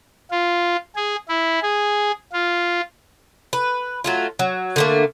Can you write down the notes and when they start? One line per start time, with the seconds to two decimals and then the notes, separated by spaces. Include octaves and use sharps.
0.31 F4
0.96 G#4
1.28 E4
1.62 G#4
2.32 F4
3.53 B4
4.04 F#3 A3 F4
4.39 F#3
4.76 D3 A3 A#3